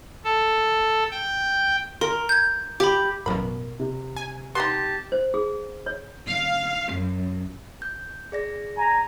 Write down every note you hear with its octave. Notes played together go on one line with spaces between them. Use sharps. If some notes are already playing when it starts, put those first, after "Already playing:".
A4
G5
A#4 C6
G6 G#6
G4 B5 D6
A1 F#2 B2 A#3 A#4 B5
C3
G#5
B3 D#4 G4 A5 C6
C5
G#4
C#5
F5
F#2
G6
G#4 D5 A#6
G#5 A#5